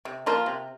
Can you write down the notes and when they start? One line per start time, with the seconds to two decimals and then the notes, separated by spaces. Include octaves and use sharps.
0.05 C3
0.26 F3 A#3 F4
0.46 C3